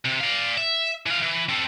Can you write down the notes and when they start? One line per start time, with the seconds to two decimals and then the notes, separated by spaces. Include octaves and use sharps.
0.05 C3
0.20 D5 F5
0.58 E5
1.06 E3 F5
1.22 E3
1.49 C4 A4